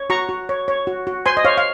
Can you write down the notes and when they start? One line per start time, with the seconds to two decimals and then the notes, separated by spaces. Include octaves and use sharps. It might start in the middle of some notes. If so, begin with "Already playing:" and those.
Already playing: C#5
0.10 F#4 A#5 C#6
0.29 F#4
0.49 C#5
0.68 C#5
0.87 F#4
1.07 F#4
1.26 C5 G#5 C6
1.37 D#5
1.45 C5 C#5 F5
1.58 F5